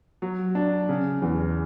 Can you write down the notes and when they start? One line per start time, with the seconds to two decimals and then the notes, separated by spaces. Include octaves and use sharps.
0.22 F#3
0.55 D4
0.89 C#3
1.22 E2